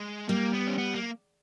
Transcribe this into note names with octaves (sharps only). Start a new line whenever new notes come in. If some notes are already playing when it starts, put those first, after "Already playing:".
Already playing: G#3
G3 A#3
B3
C#4
B3
A#3